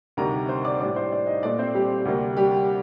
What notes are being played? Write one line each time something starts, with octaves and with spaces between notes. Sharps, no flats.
D2 C3 D#3 G3 A#4 A#5
C5 C6
D5 D6
A2 G3 D4 D5 D6
C5 C6
D4 D5
D#4 D#5
A#2 A3 D4 D5
C4 C5
G3 G4
D2 C3 G3 A#3
G3 G4